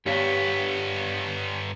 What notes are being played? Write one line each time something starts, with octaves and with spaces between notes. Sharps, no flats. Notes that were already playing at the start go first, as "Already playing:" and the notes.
G2 B3 G4 C#5 F5